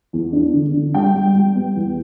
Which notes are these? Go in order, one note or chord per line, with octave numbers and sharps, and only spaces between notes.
E2
D4
D3
D3
G3 G5
G3
G3
B3
E2